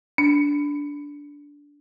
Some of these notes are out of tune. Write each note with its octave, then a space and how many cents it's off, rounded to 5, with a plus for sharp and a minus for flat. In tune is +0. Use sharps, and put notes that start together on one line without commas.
D4 -15